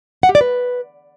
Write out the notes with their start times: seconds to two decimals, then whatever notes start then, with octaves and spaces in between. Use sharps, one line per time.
0.23 F#5
0.29 G4
0.35 D5
0.41 B4